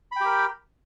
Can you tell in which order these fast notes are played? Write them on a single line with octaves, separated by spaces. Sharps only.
B5 G5 G4 A#4